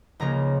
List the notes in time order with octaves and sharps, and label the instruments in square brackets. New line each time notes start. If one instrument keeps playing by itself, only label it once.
[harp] C#2 C#3 F3 A#3 A#5